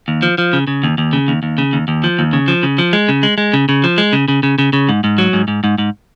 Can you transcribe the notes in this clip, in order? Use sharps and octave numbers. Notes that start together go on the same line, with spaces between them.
D#2
F3
F3
C#3
C#3
D#2
D#2
C#3
D#2
D#2
C#3
D#2
D#2
F3
D#2
C#3
F3
C#3
F3
G#3
C#3
G#3
G#3
C#3
C#3
F3
G#3
C#3
C#3
C#3
C#3
C#3
G#2
G#2
F#3
G#2
G#2
G#2
G#2